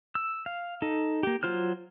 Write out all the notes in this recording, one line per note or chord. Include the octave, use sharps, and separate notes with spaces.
E6
F5
D#4 A4
A#3 G4
F#3 F4 C5 F6